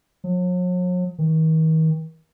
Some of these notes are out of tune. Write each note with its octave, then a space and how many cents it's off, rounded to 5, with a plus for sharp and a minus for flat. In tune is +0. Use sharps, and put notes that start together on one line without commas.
F#3 -45
D#3 +40